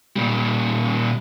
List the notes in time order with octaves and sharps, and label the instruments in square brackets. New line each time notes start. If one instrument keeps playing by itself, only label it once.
[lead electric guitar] A#2 G3